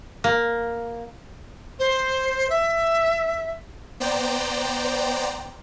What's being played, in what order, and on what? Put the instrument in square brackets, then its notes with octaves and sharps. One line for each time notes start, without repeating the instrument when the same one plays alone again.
[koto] A#3
[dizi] C5
E5
[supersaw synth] B3 C5 D5 G5 A#5